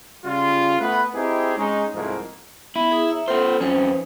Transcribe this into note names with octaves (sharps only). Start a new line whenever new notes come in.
C#3 G3 F4
A3 B3 B4
C4 D#4 E4 G4 G#4
G#3 C#4 D#4
C2 G#2 F3 A3 A#3
B3 E4
G#4 D#6
C#5 E5 A#5
B3 F4 A4 C5
F2 C#4 D#4 B4 C5